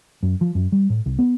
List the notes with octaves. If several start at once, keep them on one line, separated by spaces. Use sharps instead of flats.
F#2
F3
F#2
G3
A2
C2
B3